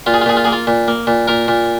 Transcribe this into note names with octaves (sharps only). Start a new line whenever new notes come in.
A#2 F4
G#4
F4
A#2 G#4
F4
A#3 G#4
F4
A#2
A#3
A#2
A#2 A#4
A#2